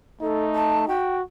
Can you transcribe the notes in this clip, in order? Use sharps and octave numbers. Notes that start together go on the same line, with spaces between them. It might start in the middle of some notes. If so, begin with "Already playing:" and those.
A3 D#4 A4
A5
F#4 G5